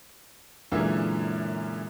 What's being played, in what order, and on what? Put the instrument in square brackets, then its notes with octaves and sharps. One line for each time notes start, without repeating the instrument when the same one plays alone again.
[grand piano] F#2 A#2 D3 E3 G#3 E5